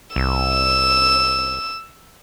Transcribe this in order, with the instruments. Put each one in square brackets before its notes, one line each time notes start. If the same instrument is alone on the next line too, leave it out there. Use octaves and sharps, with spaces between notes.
[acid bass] C2 [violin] E6